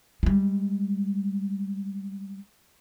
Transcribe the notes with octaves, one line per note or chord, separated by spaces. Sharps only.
G3 G#3